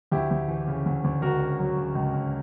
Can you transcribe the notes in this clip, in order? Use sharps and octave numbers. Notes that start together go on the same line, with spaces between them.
D2 E4 G4
D2
E3
C#3
D2
D2
C#2 F#4 A#4
C#4
F#3
C#3
C#2
C#4